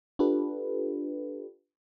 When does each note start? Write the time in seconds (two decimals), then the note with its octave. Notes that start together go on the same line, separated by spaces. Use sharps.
0.19 D4 F4 G4 A4 B4